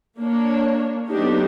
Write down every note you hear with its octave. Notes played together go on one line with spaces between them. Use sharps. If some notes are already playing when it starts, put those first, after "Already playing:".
A#3 D4 C#5
F#3 A3 B3 D4 D#4 G4